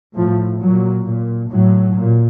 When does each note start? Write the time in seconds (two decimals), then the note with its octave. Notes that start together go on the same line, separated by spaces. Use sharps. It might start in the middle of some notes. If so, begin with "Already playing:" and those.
0.16 A2 F3
0.61 A#2 F#3
1.05 A#2
1.50 A2 F#3
1.94 A#2